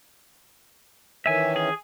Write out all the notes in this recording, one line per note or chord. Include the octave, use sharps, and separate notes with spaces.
D#3 E3 C#4 E5 G#5
G#4